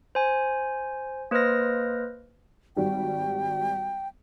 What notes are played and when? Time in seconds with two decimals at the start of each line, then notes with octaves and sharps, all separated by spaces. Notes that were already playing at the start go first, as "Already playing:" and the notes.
0.15 C5 G#5
1.31 A#3 B4 C5 D#5 F6 A#6
2.77 G#1 G3 F#4 G5